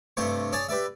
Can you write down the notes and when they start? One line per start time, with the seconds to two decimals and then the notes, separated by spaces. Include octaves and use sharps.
0.17 G2 C3 A3 G4 C5 C#6
0.52 G#4 C#5 D5 G#5 A5
0.68 G4 B4 D5 E5